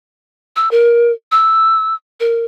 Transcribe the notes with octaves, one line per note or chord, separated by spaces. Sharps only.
E6
A#4
E6
A#4